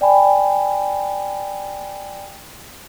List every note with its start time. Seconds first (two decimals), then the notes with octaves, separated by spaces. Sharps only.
0.01 D5 G5 G#5 B5